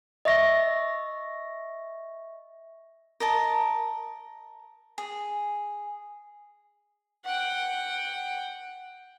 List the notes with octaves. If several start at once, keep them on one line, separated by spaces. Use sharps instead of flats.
D#5 E5 C#6 A#6
A#4 D#5 A5
G#4
F#5 G5